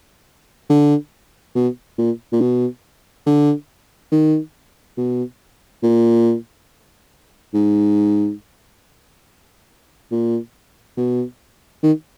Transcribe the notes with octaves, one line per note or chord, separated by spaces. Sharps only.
D3
B2
A#2
A#2
B2
D3
D#3
B2
A#2
G#2
A#2
B2
D#3